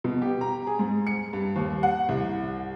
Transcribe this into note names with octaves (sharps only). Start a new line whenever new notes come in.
B2
G4
A#5
G#4
G#2
C#7
G2
D#2
F#5
C2